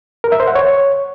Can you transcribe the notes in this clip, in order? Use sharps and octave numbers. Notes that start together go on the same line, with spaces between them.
A#4
E5
C5
F#5
C#5